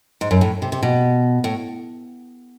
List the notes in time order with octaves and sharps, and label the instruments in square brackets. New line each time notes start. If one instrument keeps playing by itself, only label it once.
[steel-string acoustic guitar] G#2
F#2
A2
C3
C3
B2
A2